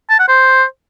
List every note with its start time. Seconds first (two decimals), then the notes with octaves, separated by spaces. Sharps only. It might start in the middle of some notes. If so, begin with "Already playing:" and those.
0.10 A5
0.19 F#5
0.28 C5